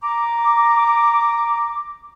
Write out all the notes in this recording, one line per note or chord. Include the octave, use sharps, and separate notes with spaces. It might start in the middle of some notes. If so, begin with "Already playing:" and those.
A#5 D6